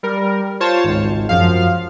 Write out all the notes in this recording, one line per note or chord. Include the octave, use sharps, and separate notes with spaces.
G3 A#4
F4 C5 C#5 A5
G#1 C#2
F#2 F3 F5